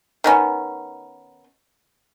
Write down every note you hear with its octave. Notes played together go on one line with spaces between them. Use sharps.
D#3 B3 C#4